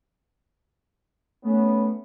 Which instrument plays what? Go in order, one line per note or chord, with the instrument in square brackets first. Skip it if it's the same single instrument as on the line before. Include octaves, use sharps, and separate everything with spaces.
[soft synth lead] A3 [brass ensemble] B3 C#4